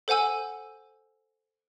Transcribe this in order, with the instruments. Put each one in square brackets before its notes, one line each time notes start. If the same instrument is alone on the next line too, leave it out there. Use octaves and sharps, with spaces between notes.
[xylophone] A4 C5 F#5 G#5 E6